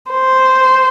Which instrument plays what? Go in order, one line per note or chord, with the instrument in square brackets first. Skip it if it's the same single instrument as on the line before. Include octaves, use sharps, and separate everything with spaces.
[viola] C5